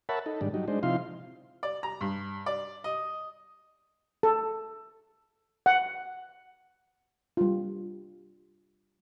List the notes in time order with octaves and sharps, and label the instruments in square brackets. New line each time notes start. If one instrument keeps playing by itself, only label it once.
[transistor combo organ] A#4 C#5 E5 F#5 A5 B5
D#4 A4
G#2 D#3 G3 D4
F#3 G3 D#4
G#3 D4 D#4 C5
C3 F3 D#4 E4 F5 C6
[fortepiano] D5
A#5
G2
D5
D#5
[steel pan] A4
F#5
G3 F4